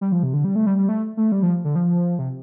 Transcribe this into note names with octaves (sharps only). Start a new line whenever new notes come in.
G3
F3
C3
D3
G3
A3
G3
G3
A3
A3
G3
F3
D3
F3
C3